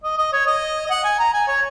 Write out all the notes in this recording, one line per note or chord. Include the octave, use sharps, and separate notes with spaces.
D#5
D#5
C#5
D#5
D#5
F#5
G#5
A#5
G#5
C#5